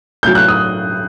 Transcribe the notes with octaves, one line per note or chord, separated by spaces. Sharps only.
A2 F#3 G6
F#6
D#6